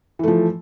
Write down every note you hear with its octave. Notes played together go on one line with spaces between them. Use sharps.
E3 F3 A3